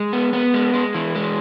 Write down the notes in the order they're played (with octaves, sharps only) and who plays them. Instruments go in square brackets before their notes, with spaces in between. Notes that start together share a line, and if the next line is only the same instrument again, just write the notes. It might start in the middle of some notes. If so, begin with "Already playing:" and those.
Already playing: [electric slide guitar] G#3
B3
B3
G#3
G#3
E3
G#3